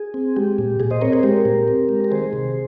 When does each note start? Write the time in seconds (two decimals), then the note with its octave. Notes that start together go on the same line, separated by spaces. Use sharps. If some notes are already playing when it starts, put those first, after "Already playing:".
Already playing: G#4
0.14 C4
0.36 G#3 G4
0.58 A#2
0.80 A#2 G#4
0.91 C5 D#5
1.01 C4 A#4 C#5
1.12 G#4 C5
1.23 G#3 G4 A#4
1.45 A#2
1.68 C4
1.89 G#3
2.04 A#4
2.11 D#3 G#4 C5
2.33 C3